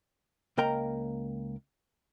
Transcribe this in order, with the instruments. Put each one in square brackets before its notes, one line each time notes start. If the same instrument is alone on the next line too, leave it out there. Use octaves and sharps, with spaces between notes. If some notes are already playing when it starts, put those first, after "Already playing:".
[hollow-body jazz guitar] C#2 A#3 A#4 G5 A#5